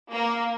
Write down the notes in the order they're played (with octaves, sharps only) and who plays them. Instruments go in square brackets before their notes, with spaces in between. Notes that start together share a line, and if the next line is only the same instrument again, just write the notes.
[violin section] A#3